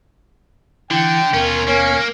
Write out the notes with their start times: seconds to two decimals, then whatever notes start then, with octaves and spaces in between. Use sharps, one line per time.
0.91 D3 E3 G5
1.34 D#2 B2 C#4 F4 A#4
1.67 A#3 C#4